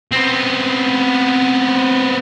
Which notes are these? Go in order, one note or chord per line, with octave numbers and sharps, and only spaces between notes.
B3 C4